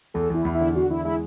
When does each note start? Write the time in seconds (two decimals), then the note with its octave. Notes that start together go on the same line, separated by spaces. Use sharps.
0.14 E2 A4
0.30 E2 E4
0.45 E2
0.55 E4
0.61 D3
0.75 D3 F#4
0.90 E2 E4
1.05 G#3 E4